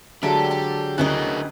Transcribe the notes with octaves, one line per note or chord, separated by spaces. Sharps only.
D3 F#3 G#3 A3 D4 G4 A4
A4
D2 B3 C#4 E4 G4 A#4 D#5 F#6